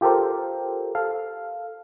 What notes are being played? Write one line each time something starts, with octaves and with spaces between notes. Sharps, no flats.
F4 G4 A4 A#4 C5
A4 F5